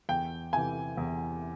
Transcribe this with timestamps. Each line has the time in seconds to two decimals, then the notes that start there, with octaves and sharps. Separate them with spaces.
0.09 E2 G5
0.53 C3 E3 G#5
0.97 E2